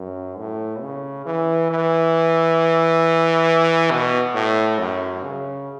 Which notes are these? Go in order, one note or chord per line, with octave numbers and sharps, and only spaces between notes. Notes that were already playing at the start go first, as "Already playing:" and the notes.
Already playing: F#2
A2
C#3
E3
E3
B2
A2
F#2
C#3